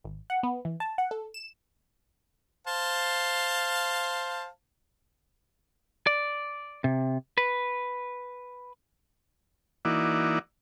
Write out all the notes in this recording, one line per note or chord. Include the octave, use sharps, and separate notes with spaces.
G#1
F#5
B3
E3
A5
F#5
A4
E7
C5 F5 A5
D5
C3
B4
E3 A#3 D#4 E4 F#4 D5